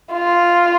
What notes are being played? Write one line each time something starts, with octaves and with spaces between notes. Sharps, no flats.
F4